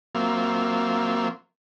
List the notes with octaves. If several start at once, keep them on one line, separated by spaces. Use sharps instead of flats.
F#3 A#3 C4 F4 E5